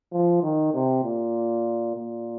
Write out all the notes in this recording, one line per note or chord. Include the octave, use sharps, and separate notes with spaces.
F3
D#3
C3
A#2
A#2